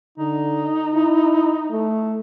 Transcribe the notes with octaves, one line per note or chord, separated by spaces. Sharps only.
D3 D#4
E4
A3